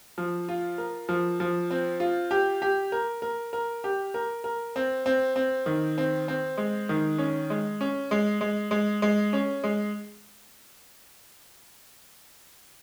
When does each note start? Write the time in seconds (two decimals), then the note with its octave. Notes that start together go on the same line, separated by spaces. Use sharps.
0.18 F3
0.49 F4
0.78 A#4
1.09 F3
1.40 F3
1.71 C4
2.00 F4
2.31 G4
2.62 G4
2.92 A#4
3.22 A#4
3.53 A#4
3.84 G4
4.14 A#4
4.44 A#4
4.76 C4
5.06 C4
5.36 C4
5.66 D#3
5.98 C4
6.28 C4
6.57 G#3
6.89 D#3
7.18 C#4
7.50 G#3
7.81 C#4
8.11 G#3
8.41 G#3
8.71 G#3
9.02 G#3
9.33 C#4
9.64 G#3